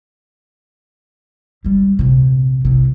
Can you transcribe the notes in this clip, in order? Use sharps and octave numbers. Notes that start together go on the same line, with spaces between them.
C#2 G3
A#1 C3
C2 C3